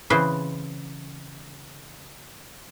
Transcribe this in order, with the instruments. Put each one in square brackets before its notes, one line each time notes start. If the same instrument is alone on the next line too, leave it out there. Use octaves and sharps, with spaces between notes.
[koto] C#3 E3 C4 G#4 B4 C5